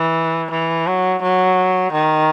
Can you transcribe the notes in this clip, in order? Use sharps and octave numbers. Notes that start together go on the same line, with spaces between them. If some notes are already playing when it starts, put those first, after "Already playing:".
Already playing: E3
E3
F#3
F#3
D#3